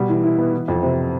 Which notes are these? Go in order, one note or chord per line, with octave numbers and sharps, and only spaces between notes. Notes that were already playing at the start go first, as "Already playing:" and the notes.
Already playing: B2 G3
E3
E4
B3
E3
F2
C3